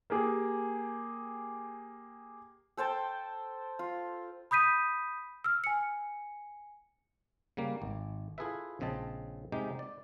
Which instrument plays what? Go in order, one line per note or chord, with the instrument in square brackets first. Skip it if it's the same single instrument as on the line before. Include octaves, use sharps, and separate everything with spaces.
[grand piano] A#3 G4 G#4
[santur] A4 C5 G5 A5
F4
[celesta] B5 D#6 G6 B6 D#7
E6 F6
G#5 C#7
[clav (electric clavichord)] C#3 G3 A#3
G#1
E4 F4 G#4 A4 B4 E5
A#1 C#3 C4 D#5 A5
C3 G#3 D#4 G4
D5